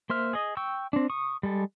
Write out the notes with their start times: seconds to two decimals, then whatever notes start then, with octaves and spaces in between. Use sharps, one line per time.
0.10 A#3 C5 E5 F6
0.33 G#4 D#5
0.57 G5 C#6 E6
0.93 C4 D4
1.10 C#6 D#6
1.43 G3 G#3 A4